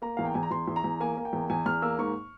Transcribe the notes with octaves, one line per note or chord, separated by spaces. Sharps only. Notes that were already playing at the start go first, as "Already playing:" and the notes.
A#3 A#5
E2 F5
G5
E2 G#5
A#5
E2 C6
E2
A#5
E2
A#3 G#5
A#3
G5
E2
E2 G#5
E2 F6
A#3 E6
G#2 C#6